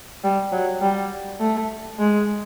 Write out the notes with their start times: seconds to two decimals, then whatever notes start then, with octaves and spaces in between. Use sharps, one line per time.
0.24 G3
0.52 F#3
0.81 G3
1.40 A3
1.99 G#3